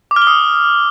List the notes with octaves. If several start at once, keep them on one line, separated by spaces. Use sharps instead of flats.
D6
F6
G7
D#6